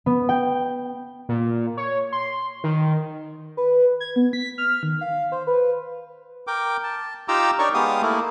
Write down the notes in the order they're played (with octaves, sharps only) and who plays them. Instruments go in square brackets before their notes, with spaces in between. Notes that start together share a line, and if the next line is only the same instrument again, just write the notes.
[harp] B3
G5
[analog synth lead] A#2
C#5
C6
D#3
[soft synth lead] B4
G#6
B3
B6
F6
D#3
F5
C5
B4
[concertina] A#4 G5 D6
A5
D#4 F4 G4 A#5 D6 E6
D4 D#4 A#4 C#5 D5 C#6
G#3 B3 G4 F5 D#6
A3 A#3 E4